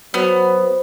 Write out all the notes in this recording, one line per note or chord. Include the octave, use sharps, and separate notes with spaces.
F#3 B3 C5